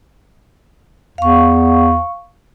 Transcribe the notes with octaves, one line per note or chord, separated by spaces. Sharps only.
E2 F5 C#6